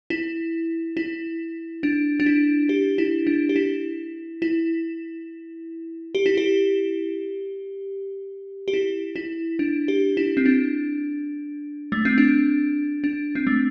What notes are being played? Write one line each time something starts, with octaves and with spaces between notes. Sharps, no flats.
E4
E4
D4
D4
E4
G4
E4
D4
G4
E4
E4
G4
E4
G4
G4
E4
E4
D4
G4
E4
C4
D4
A3
C4
D4
D4
C4
A3